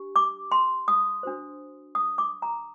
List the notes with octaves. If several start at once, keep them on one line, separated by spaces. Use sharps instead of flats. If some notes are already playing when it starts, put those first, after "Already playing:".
Already playing: D4 G4
D6
C6
D#6
D4 F#4 C5
D#6
D6
A#5